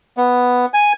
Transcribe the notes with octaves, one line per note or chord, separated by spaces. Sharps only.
B3
G#5